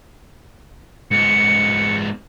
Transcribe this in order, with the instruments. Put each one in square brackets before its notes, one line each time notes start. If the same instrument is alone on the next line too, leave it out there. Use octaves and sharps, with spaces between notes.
[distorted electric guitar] G#2 B3 [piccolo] C#7